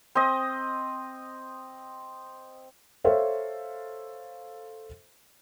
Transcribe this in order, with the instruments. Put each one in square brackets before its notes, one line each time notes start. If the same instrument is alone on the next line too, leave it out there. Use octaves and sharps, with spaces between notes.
[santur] C4 D#5
[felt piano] A4 C5 C#5 E5 F5